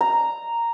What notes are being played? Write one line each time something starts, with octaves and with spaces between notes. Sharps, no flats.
A#5